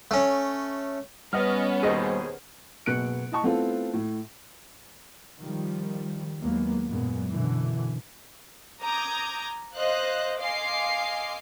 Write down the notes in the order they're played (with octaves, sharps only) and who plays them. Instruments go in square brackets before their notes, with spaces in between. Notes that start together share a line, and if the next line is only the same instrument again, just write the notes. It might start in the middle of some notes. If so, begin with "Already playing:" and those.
[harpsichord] A3 C#4
[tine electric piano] G3 [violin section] B3 C#4 [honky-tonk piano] D#5 F#5 F6
[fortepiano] D#2 B2 D#5 [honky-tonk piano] G#4 C5
[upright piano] F#1 B2 B3 F#6 C#7 D7
E4 D#5 A5 C#6
A3 B3 C4 E4 F4 A4
A2
[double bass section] D#3 F3 G3
D#2 F#3 G#3 A#3 B3
F#2 A#2 G#3 B3
F#2 B2 D3 E3
[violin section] A#5 D6 D#6 G6 G#6
C5 D#5 F5 F#6
D#5 F5 G#5 C6 D6 C7